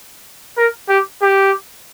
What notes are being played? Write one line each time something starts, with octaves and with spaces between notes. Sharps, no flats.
A#4
G4
G4